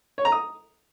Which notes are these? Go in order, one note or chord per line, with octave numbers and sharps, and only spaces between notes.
C#5
A#5
D#6